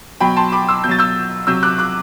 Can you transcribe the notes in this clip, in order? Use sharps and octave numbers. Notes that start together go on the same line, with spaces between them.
B2 F#3 G5 B5
A5 C6
B5 D6
C6 E6
B2 F#3 G6 A6
E6 G6
C3 F#3 E6 G6
D6 F#6
D6 F#6